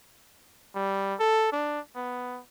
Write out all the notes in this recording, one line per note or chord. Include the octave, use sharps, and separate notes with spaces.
G3
A4
D4
B3